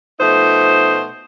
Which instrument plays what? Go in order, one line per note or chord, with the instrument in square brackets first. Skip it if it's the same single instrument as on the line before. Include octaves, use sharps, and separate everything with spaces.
[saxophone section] B2 F3 A3 D#4 C5